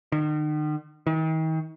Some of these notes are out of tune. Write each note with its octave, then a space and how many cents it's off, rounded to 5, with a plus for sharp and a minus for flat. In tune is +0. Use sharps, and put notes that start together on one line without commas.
D#3 -40
D#3 +40